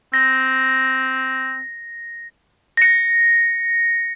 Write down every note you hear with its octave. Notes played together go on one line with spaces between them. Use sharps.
C4 A#6
A#6 C#7